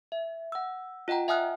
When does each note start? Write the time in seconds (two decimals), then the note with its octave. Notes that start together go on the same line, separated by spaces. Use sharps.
0.12 E5
0.52 F#5 E6
1.08 F4 D#5 F#5 G5 A#5
1.28 E5 F#5 G#5 D#6 F6 F#6